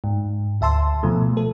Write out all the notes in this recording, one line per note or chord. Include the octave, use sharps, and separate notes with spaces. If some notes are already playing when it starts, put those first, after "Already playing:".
G#2
D2 E5 A5 C6 E6
B2 F3 A3
A4